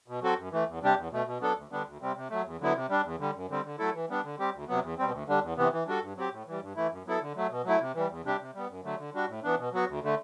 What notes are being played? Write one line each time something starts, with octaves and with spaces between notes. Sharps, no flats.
B2
F#3 C4 F#4 A4
F#2
E3 A3
E2
C3 G3 D4 G4
E2
B2 A3
B2
F#3 B3 D4 A4
D2
D3 G3 B3 D4
D2
C3 G3 C4
C3
F#3 A3
E2
D3 F#3 B3 E4
C3
G3 D4
E2
D3 G3
F#2
D3 G3 C4
D3
F#3 A3 E4 A4
E3
G3 B3 D4
D3
G3 C4 G4
D2
C3 F#3 B3
E2
B2 G3 C4
D2
D3 G3 D4
E2
C3 E3 B3
E3
G3 D4 F#4 A4
G2
F#3 C4 G4
A2
E3 G3
G2
E3 A3 E4
F#2
F#3 B3 E4 A4
D3
F#3 A3
B2
F#3 A3 E4
C3
E3 G3
E2
C3 G3 D4 G4
C3
G3 B3
F#2
D3 F#3 A3
D3
G3 D4 F#4
A2
E3 B3 D4
B2
F#3 B3 F#4
D2
D3 A3